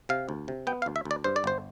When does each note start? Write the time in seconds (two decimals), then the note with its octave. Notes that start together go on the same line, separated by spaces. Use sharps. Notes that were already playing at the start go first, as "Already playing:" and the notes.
0.09 C3 F5
0.29 D2
0.48 C3
0.67 B3 G5
0.82 F5
0.86 D2
0.96 E5
1.05 D2
1.11 D5
1.24 G2 C5
1.36 D5
1.44 G1 C5